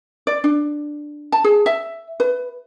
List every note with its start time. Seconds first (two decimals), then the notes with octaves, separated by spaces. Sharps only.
0.27 D5
0.44 D4
1.32 A5
1.44 G#4
1.66 E5
2.20 B4